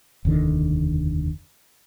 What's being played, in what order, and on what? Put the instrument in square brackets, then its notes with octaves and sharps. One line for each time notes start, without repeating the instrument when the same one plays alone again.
[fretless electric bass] F1 D#2 D3 D#3